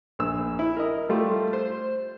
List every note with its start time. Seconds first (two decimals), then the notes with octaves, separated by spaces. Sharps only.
0.19 A#1 E6
0.59 E4
0.77 A#4 D#5
1.09 G3 A3 F4
1.53 C5